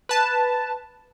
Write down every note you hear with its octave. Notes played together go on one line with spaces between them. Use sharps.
B4 A5